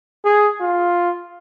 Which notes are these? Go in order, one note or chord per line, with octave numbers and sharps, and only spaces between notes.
G#4
F4